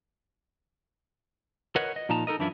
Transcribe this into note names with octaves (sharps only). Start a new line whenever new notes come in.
A#4 B4 C#5 D#5 F#5
D#5
A#2 F3 D#4 A5 A#5
D#4 A4 A#4 D#5
F#2 E3 D4 E4 F4